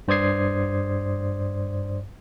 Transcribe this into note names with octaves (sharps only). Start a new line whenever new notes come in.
G2 C5 D5 D#6 G#6 C7